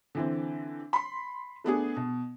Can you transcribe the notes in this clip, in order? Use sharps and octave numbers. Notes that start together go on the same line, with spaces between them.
D3 E3 C4
B5 C6
A3 B3 D4 G#4
B2